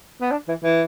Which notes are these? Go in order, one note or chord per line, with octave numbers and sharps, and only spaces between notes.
B3
D4
E3
E3